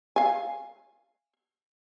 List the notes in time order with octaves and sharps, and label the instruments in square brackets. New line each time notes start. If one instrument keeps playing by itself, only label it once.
[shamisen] F5 G#5